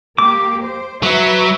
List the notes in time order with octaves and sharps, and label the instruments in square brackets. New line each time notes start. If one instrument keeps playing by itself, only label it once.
[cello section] A#3 G4 [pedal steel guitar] D6
[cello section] C5
[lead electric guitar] F#3 [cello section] B4 E5